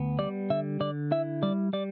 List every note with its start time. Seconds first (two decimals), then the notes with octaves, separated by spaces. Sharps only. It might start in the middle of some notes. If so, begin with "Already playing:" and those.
Already playing: D2 B3
0.19 G3 D5
0.50 D3 E5
0.81 D3 D5
1.12 E4 E5
1.43 G3 D5
1.73 G3 D5